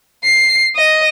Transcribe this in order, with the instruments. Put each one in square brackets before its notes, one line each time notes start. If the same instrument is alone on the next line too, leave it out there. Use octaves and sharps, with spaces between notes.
[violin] C7
D#5